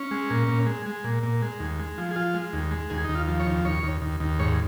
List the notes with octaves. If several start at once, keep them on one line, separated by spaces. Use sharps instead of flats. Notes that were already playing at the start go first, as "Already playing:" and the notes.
Already playing: C#4
G#3
A#2
A#2
G#3
G#3
A#2
A#2
G#3
D#2
G#3
F3
G#4
F3 F4
G#3
D#2
G#3
D#2 G#4
D#2 D#4
F4
F3
C#5
D#2
D#2 C#5
D#2
D#2
D#2
G#2 C#5